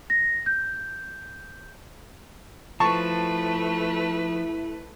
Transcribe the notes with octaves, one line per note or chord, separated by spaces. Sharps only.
A#6
G6
F3 A3 E4 B4 A5 C#6